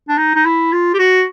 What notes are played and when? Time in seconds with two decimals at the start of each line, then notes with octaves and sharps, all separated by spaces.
0.08 D4
0.17 D#4
0.35 D#4
0.45 E4
0.72 F4
0.94 G4
0.99 F#4